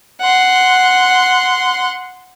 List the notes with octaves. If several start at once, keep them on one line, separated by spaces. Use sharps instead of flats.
F#5 C6